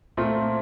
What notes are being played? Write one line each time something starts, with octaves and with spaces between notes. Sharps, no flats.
A#2 A3 C4 F4